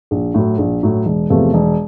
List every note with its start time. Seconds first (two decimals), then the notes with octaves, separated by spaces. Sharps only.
0.11 A#1
0.34 A2 F#3
0.58 A#1
0.83 A2 F#3
1.06 E1
1.30 E2 C3 F3 A3
1.54 E1